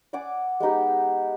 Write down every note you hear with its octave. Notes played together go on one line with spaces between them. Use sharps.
D5 F#5 G#5 D6
G#3 B3 D#4 G4